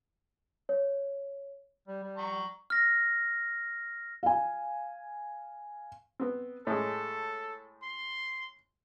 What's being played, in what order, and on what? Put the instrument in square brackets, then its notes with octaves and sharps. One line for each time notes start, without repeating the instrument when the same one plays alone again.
[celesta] C#5
[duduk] G3
G3
[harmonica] A#5 C#6
[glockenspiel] F6 A#6
[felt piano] F5 G#5
[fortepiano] B3 C4
[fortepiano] A2 G#3 [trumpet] A4
[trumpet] C6